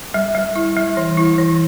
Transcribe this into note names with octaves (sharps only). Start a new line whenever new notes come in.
G3
G3
E4
G3
E3
E4
E3